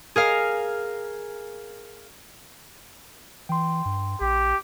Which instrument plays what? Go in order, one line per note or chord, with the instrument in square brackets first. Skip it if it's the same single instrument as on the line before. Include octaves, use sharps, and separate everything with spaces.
[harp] G#4 A#4 F5
[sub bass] E3 [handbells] G5 C6
[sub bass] G2
[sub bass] A#1 [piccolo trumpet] G4